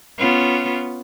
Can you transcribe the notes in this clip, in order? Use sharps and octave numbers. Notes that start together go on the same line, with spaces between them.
B3 C#4 F4